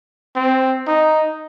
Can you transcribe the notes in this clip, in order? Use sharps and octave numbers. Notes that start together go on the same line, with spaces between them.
C4
D#4